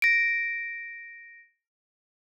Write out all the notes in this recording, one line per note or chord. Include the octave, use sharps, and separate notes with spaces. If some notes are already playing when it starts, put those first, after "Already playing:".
A#6 D7